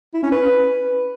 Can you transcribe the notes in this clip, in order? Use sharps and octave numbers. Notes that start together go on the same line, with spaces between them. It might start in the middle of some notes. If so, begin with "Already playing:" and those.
E4
C#4
B4